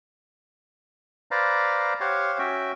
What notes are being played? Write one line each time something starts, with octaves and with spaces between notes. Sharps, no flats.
B4 C5 D5 F5 A#5
G4 C5 C#5 F5 F#5
C#4 F#4 E5 G5